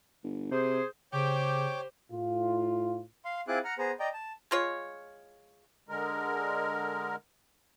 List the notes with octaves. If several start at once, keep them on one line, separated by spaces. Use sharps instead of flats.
G1
C3 G#4 C5
C#3 G4 C5 C#5 G5 D6
A2 F4
F5 C6
C4 E4 F4 G#4 D6 F#6
F#5 A#5 F6
B3 G#4 C5 A#5
D5 D#5 G5 A#5
A5
G#3 F4 C#5
D3 G#3 A#4